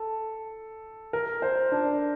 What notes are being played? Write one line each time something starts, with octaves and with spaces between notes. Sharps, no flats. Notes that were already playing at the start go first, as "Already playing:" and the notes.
Already playing: A4
A#4
C5
D4